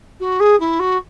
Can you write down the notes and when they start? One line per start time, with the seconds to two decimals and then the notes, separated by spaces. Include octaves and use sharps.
0.20 F#4
0.40 G#4
0.60 E4
0.79 F#4